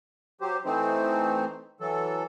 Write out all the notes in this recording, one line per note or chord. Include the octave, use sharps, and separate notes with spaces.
F#3 G4 C5
E3 A3 C4 D#4 C5
E3 F#3 A4